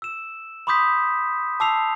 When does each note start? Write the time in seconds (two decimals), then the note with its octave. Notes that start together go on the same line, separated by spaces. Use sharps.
0.02 E6 E7
0.67 B5 C6 D6 D#6 G6 B6
1.60 A5 D6 E6 C7 F7